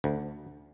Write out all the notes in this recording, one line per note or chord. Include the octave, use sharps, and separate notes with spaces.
D2